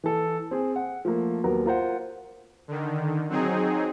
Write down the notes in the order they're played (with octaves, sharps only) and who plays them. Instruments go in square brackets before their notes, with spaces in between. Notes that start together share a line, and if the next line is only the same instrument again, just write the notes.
[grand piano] E3 A4
C4 G#4
F#5
F3 A3 A#3
D#2 F#3 B3 A#4
F4 A#4 C5 F#5
[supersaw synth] D3 D#3
F#3 C4 D#4 G#4